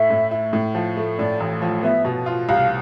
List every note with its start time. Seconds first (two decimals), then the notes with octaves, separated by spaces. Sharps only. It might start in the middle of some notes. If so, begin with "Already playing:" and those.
Already playing: A2 A3 E4 E5
0.10 A2
0.31 E4
0.53 A2
0.75 F3
0.97 A3
1.18 A2 D5
1.40 A1
1.62 F3
1.83 B3 E5
2.05 B2
2.26 F4
2.48 C2 F5